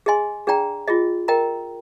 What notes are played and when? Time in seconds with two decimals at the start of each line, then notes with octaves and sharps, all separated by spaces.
0.06 G#4 D#5 G#5 C6
0.47 D4 G#4 D5 G5 A#5
0.88 F4 G#4 D#5
1.28 A#4 D#5 G5 A#5